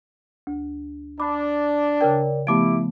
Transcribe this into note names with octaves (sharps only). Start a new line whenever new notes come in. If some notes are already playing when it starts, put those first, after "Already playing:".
D2
D4 B5 D6
C#3 A#4 D5 G5
F3 A3 B3 E4 G4 D6 D7